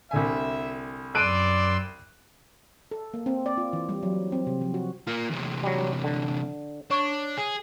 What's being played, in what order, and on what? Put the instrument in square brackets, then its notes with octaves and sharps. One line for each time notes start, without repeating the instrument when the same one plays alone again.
[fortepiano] C2 D3 G#5 [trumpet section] E5
[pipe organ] F#2 C6 E6 [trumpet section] D5 [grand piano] F#6 D7 D#7
[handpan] A4
A#3
C4
D5
F4
E3
G3
F#3
C4
C3
F3
F#4
[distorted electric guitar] A#3 F4
E2 C3
[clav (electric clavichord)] F#3 G3
D3
[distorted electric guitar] D4 [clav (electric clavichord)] C#5
[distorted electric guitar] G#4